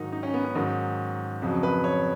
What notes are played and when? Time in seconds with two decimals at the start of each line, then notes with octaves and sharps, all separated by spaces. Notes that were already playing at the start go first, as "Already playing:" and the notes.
Already playing: G#2 D#3 F#3 D#4
0.12 D#4
0.23 C#4
0.34 B3
0.44 C#4
0.55 G#2 D#3 F#3
1.42 F2 C#3 F#3
1.63 B4
1.84 C#5